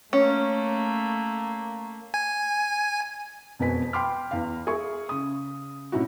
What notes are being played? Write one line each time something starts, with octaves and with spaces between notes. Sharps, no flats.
A3 A#3 C#4
G#5
E1 F2 B2 B3 G#5 B6
G5 B5 C6 D6 F6
E2 F5
G#4 E5 C#6
C#3 D#6
A2 C3 C#4 D#4 E4 F#4